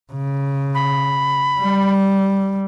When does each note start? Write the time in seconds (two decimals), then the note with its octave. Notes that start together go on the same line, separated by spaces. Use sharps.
0.13 C#3
0.75 B5
1.60 G3